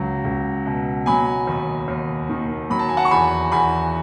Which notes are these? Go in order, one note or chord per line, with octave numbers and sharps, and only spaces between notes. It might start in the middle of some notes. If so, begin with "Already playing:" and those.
Already playing: C#2 F#3
C#2
B2
F#3 G#5 B5
D#2
D#2
D#3
F#3 B5
A5
G#5
F#5 A5
C#6
E2 G#5 B5
E2 G#5 B5